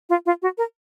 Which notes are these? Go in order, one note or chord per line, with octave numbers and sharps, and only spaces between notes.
F4
F4
F#4
A#4